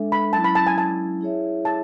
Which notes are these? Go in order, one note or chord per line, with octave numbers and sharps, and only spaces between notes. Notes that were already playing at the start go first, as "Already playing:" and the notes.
Already playing: G#3 D4 A4 E5
B5
F#3 C#4 E4 A5
B5
A5
G#5
A5
E4 G#4 C#5 E5
A5